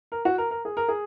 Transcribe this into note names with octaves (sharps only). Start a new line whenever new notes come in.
A#4
F#4
A#4
A#4
G#4
A#4
G#4